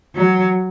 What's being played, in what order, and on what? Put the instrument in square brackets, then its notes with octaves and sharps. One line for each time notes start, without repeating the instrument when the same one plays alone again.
[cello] F#3